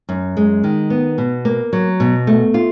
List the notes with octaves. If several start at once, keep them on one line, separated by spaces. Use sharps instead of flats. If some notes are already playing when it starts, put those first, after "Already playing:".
F#2
G#3
D#3
B3
B2
A#3
F#3
B2
A3
F4